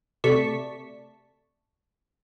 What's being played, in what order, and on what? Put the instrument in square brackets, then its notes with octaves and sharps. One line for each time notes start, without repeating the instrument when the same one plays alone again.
[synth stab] C3 A3 D5 A5 C#6 B6